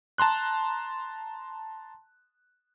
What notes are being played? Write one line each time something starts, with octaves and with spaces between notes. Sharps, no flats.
A5 A#5 C6 F#6